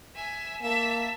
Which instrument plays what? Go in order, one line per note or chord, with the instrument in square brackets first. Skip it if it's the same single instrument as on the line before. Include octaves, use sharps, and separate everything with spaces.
[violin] E5 G#5
[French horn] A#3 [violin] E5 A5